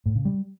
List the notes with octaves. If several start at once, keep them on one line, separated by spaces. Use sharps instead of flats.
A2
C#3
G3